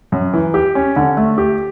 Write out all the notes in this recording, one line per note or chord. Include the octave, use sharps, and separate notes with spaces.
F#2
E3
G4
C#4
D3
A3
G4